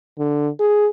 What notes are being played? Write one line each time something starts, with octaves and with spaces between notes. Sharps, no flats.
D3
G#4